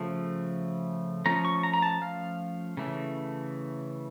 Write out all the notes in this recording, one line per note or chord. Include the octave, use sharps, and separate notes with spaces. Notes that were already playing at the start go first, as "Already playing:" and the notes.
Already playing: C#3 F3 A3
F3 A3 C#4 A#5
C#6
A#5
A#5
A5
F5
C#3 E3 A3